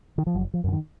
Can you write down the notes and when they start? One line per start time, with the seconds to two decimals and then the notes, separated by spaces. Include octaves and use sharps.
0.18 D#3
0.27 F3
0.34 F#1 F#3
0.54 F3
0.64 F#2 C#3
0.72 D#3